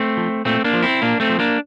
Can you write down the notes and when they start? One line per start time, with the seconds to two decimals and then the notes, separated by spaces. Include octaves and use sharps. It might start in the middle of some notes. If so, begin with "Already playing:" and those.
Already playing: A3 C4
0.17 F3
0.45 A#2 A3 C4
0.64 A#3 D4
0.74 F3
0.82 C4 E4
1.02 A#2 A#3 D4
1.20 A3 C4
1.30 F3
1.39 A#3 D4